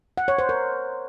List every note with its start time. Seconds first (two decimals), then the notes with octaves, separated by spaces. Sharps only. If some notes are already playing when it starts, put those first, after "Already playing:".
0.18 F#5
0.28 C#5
0.39 C5
0.49 A#4